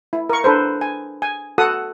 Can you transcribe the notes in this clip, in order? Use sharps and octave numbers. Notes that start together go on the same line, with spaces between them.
E4
A#4 C#6
D4 A4 B4 C5
G#5
G#5
F#4 A4 F#5 D#6